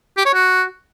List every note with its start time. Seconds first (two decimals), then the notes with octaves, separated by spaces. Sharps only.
0.17 G4
0.26 C#5
0.34 F#4